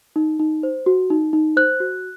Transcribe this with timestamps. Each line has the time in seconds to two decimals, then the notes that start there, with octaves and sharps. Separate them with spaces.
0.16 D#4
0.39 D#4
0.63 C5
0.86 F#4
1.10 D#4
1.33 D#4
1.57 C5 F#6
1.80 F#4